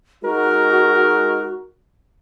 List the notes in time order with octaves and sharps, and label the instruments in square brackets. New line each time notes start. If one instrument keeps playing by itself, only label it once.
[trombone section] G#3 D#4 A#4 [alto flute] F#4